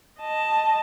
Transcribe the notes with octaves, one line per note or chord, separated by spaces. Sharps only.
D#5 A5